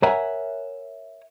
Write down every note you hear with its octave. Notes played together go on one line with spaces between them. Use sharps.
A#4 C#5 E5 F#5 G#5 A#5